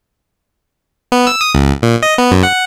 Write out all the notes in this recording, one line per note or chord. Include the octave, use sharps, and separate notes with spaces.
B3
E6
D#6
C#2
A#2
D#5
B3
F#2
F#5